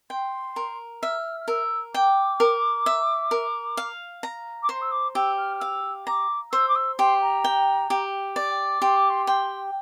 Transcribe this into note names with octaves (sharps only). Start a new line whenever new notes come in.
G5 C6
A#4
E5 F6
F6
A#4 E6
G5 D6
A#4
E5
A#4
F5
A#5
D6
C5 C6
E6
D6
G4 E6
F6
F6
F5 E6
A#5 D6
C5 E6
D6
E6
G4 C6
A#5
G5
G4
D5
G4 C6
D6
C6
G5 C6